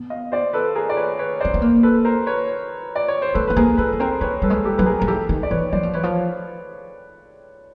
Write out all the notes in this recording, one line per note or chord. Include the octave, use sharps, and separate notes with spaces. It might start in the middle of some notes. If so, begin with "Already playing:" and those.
Already playing: B3
D#5 F5
C5 D5
A4 B4
G#4 A#4
D5
B4 C#5
B4 C#5
C5 D5
C4
B3
A#3
A4 B4
A#4 C5
B4 C#5
D5
C#5
C5
A3 A4 B4
B3 B4
A#3 G#4 A#4
B3 A4 B4
B3
C4 A#4 C5
A#3 B4 C#5
G3 A4 B4
G#3
G4 A4
F#3 B4
G#4 A#4
F3 A#4
E3 G4 A4
D#3
D5
E3 B4 C#5
F#3 C5 D5
F3
E3 B4 C#5
F3